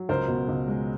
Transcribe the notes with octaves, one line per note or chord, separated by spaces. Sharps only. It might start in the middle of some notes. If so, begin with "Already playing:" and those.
Already playing: F#3
C#2 A#4 C5
B2
C#2
G#3